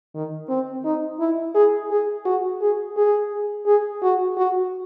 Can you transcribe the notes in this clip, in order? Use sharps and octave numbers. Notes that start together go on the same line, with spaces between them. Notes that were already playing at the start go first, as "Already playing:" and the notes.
D#3
C4
D#4
E4
G#4
G#4
F#4
G#4
G#4
G#4
F#4
F#4